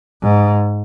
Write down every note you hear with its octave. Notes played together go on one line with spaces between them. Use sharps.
G#2